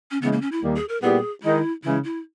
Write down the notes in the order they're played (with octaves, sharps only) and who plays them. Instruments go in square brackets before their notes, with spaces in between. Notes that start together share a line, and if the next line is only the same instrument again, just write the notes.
[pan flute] C#4
[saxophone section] C#3 E3 G#3 [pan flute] B3
[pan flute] A#3
C#4
E4
[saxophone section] D#2 D#3 G3 A#3 D#4
[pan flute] G#4
A#4
[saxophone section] A#2 G3 B3 E4 G4 [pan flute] G#4
[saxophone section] D#3 G#3 D#4 [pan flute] E4
[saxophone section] C#3 E3 G#3 [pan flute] E4
[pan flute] E4